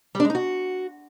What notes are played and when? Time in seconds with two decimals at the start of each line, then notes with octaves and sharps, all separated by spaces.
0.15 G3
0.20 D4
0.25 G#3
0.30 D#4
0.35 F#4